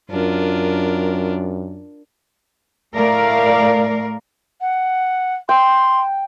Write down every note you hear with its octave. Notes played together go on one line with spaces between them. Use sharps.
F#2 D4 F4 A#4
A2 A3 A#4 D5 F5
F#5
G5 C6